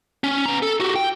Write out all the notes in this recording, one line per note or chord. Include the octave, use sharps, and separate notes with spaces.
C#4
B3 A#5
A4
F#4 G4
G5